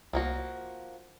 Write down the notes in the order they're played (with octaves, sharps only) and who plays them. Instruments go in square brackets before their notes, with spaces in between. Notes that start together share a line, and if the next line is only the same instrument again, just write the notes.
[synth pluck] C2 [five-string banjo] F3 A#3 F#4